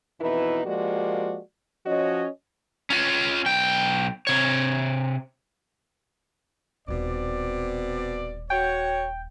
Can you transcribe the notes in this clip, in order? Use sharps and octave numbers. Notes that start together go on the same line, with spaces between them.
F2 B2 E3 D#4 E4 B4
F3 G#3 A#3 F#4 G4 D5
F3 C#4 F#4 C#5 D#5
C#4 F4
B1 G5
C3 C#5
D#1 B2 C4 D#4 D5
F#4 C#5 G5